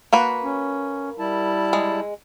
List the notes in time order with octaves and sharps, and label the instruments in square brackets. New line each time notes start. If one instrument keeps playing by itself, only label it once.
[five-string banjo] A#3 F#4 B4
[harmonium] C#4
G3 E4 A5
[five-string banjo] G#3